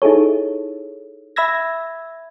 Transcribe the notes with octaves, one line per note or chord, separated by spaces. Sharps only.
D#4 E4 G#4 A4 C#5
E5 B5 E6 G#6 A#6